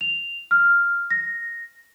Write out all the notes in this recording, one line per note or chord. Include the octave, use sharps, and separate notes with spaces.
F7
F6
A#6